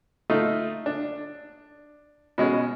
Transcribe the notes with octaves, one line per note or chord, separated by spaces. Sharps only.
A3 D#4 F4 E5
D4
B2 G#3 C#4